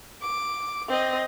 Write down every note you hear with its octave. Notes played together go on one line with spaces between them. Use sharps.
D6
C4 D#5